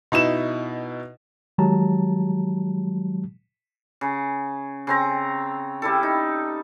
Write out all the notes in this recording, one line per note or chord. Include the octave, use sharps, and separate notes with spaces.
B2 D#4 E4 E7
D#3 F#3 G#3 G4 A5 A#5
C#3
C#3 C4 A#5
G3 E4 A4
D#4